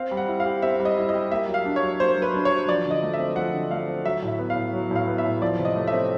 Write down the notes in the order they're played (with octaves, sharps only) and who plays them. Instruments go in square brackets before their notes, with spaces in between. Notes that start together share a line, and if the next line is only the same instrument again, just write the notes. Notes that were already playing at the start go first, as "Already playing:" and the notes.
Already playing: [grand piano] C4 [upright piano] F5
[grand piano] G3
[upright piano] F#5
[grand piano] E4
[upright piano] F5
[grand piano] G4
[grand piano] C4 [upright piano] E5
[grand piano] G3
[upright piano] D#5
[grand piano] E4
[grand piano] G4 [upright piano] D#5
[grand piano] A#3 [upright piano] E5
[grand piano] F#3
[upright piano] F5
[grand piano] D4
[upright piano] C#5
[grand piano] F#3
[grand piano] A#3 [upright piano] C5
[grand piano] F#3
[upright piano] B4
[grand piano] D4
[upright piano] C#5
[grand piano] F#3
[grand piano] F3 [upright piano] D5
[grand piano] D3 [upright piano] D#5
[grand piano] A3
[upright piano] E5
[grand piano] C4
[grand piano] F3 [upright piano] F#5
[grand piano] D3
[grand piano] A3 [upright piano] F5
[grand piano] C4
[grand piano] F#3 [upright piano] E5
[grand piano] A2
[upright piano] E5
[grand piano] B3
[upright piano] F5
[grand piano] A2
F#3
[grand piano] A2 [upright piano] F5
[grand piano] B3
[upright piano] E5
[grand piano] A2
[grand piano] F3 [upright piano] D5
[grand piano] C3
[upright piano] D#5
[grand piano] A3
[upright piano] E5
[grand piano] C4